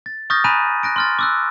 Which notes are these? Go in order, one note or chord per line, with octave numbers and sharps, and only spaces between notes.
A6
C#6 D#6 F6 G6 A6 A#6
G#5 A#5 B5 F#6 B6 D#7
F#6 A#6 D7
C6 F6 A6
D6 E6 F#6